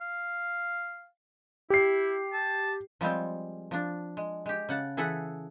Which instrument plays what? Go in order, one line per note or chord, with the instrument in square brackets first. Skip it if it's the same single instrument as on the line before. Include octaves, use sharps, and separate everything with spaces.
[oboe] F5
[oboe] E4 [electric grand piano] G4 C7
[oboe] A5
[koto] F3 G3 G#3 C4
F3 D4
G#3
G#3 G4
C#3 F#5 A5
E3 G#4 A4 E5 F#5